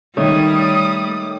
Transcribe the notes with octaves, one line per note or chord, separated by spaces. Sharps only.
D#3 G3 A3 C#5 D#6